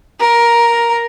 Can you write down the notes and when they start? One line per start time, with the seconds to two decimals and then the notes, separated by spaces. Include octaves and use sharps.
0.20 A#4